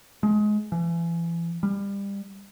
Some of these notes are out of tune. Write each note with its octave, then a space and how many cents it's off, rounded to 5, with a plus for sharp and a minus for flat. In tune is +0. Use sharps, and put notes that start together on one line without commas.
G#3 +20
E3 +35
G3 +25